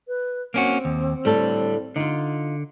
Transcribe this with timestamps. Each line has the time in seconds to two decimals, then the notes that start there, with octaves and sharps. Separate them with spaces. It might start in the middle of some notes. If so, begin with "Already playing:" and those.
0.08 B4
0.54 A#3 C4 C#4 F#4
0.85 D#2
1.25 A2 D3 G3 A4
1.96 D3 D#4 F4